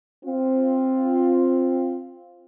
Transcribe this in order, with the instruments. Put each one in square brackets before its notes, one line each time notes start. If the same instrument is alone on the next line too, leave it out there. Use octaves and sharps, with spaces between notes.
[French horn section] C4 F4